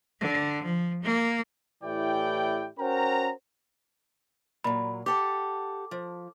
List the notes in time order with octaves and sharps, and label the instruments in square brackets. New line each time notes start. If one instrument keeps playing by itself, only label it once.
[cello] D3
F3
A#3
[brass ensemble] A2 E3 E4 G4 D5 G5
C#4 F#4 A#4 C5 G5 A#5
[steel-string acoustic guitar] A#2 F#3 [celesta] B5
[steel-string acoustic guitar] G4 A4 F#5 [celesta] D6
[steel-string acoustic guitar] F3